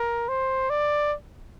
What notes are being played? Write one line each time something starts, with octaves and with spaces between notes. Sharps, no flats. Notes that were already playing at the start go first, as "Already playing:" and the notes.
Already playing: A#4
C5
D5